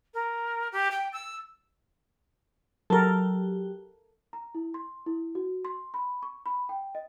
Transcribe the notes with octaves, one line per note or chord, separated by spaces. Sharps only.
A#4
G4
G5
E6
F#3 G4 A4 A#4
A#5
E4
C6
E4
F#4
C6
B5
C#6
B5
G5
D#5